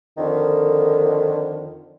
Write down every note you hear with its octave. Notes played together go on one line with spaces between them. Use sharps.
F2 D3 D#3